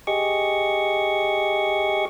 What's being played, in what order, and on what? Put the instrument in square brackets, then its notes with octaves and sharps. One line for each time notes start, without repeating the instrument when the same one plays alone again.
[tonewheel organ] G4 G#4 D#5 C#6